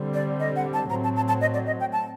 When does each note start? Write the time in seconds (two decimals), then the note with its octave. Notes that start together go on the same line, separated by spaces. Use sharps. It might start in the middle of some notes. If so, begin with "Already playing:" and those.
Already playing: D3 G3 C4
0.14 D5
0.40 D#5
0.56 F#5
0.73 A5
0.90 A2 F#3 C4 A#5
1.04 A5
1.16 A5
1.28 A5
1.41 D#5
1.54 D5
1.67 D#5
1.80 G5
1.92 A5